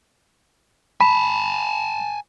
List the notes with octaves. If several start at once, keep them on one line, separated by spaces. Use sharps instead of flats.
G#5 A5 B5